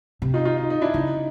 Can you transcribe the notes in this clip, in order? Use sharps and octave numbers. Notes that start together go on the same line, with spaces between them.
C3
D#4 F4
D#4 F4
D#4
D#4
D4 E4
C#3 D#4